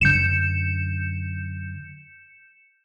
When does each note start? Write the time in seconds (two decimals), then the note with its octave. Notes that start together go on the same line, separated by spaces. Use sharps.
0.01 F#2 D3 G6 C#7 E7